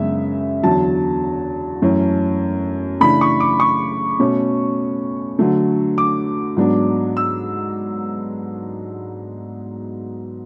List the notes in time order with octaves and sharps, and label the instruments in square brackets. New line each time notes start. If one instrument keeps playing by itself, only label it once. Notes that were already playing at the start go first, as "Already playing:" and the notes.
Already playing: [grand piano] F#2 C#3 G#3 B3 D4 E5
E2 D3 F#3 A5
F#2 E3 A3 C#4
C#3 E3 A3 D4 B5
C#6
D6
C#6
B2 A3 C#4
D3 F#3 A3
D6
G#2 F#3 B3 D4
E6